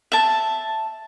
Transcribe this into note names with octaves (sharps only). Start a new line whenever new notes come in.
E5 A5